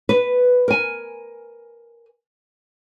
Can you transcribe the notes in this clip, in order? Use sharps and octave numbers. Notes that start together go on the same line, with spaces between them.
B4
A#4 G#5